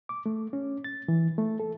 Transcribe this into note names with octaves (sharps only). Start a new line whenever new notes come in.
D6
A3
C#4
A6
E3
A3
A4